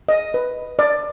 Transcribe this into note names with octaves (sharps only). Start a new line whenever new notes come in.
D#5
B4
D5